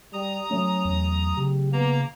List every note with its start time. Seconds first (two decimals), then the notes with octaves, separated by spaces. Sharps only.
0.13 G3 A#5 D#6
0.51 F#3 A3 C#4
0.85 E2
1.37 C#3 G4
1.73 A#3 B3 A#5